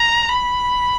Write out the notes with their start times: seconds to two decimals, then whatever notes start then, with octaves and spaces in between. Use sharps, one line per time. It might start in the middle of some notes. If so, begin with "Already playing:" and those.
Already playing: A#5
0.29 B5